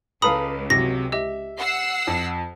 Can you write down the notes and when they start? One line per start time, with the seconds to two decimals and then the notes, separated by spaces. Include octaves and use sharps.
0.22 C#2 A4 B4 F5 A#5 B5 D#6
0.70 C3 F#3 A#6
1.12 G4 D#5 E5
1.59 F#5 E6 C7
2.07 F2